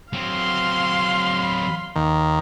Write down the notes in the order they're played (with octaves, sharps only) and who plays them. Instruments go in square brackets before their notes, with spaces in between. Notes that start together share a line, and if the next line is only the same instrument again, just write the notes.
[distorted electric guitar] F#3 C4 [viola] F5 C6
[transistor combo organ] B5
D#2 D#3